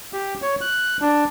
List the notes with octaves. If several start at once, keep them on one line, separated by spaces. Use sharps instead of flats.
G4
C#5
F#6
D4